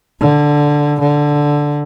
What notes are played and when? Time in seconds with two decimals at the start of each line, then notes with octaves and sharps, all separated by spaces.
0.20 D3
1.00 D3